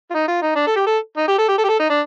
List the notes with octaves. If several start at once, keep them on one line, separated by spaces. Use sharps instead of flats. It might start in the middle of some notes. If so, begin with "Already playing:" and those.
F4
D#4
F4
D#4
D4
A4
G4
A4
D#4
G4
A4
G4
A4
G4
A4
D#4
D4